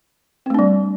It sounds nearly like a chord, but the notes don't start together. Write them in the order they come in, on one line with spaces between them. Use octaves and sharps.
C4 A3 D4 G3